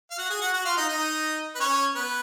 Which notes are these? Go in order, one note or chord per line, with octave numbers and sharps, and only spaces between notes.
F5
F#4 F#5
G#4 G#5
F#4 F#5
F#4 F#5
F4 F5
D#4 D#5
D#4 D#5
B4
C#4 C#5
B3 B4